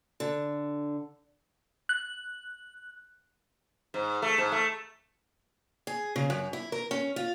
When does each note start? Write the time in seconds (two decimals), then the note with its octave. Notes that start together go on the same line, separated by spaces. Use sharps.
0.20 D3
1.89 F#6
3.94 G#2
4.22 A3
4.38 G#2
4.52 A3
5.87 G#4
6.16 C#3
6.30 F#2
6.53 E4
6.72 A#4
6.91 C#4
7.16 F4